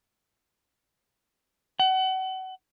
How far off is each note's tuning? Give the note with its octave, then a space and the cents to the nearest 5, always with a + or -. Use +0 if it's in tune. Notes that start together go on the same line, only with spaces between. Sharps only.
F#5 +35